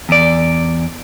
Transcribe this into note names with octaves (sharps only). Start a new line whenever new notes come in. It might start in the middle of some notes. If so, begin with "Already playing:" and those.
E2 D5